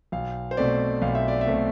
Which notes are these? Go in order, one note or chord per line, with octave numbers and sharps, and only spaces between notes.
B1 F5
C5
B2 A3 C4 D5
B1 F5
E5
D5
E5
B2 A3 C4